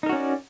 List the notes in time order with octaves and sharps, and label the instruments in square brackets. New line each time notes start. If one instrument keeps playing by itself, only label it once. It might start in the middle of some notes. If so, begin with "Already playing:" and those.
[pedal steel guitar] D#4
A#4
F#4
C#4
D5